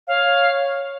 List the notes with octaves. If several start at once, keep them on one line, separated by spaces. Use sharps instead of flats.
C#5 F5